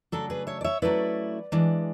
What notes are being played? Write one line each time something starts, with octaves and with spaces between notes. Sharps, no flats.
C#3 F#3 A3 D4 F#4 A4
G#4 B4
C#5 E5
D5
C#5 E5
F#3 A3 C#4 E4 B4 D5
E3 G#3 D4